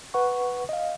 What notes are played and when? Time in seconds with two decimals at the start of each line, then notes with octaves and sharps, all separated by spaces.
0.14 B4 F#5 C#6
0.69 D#5 F5